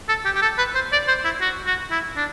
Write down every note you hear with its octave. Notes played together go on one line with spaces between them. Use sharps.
A4
G4
G4
A4
B4
C5
D5
C5
E4
F#4
F#4
E4
D4